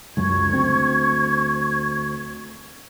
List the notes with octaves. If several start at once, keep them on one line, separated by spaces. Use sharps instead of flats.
C#2 F#2 C#6 G#6
D2 C4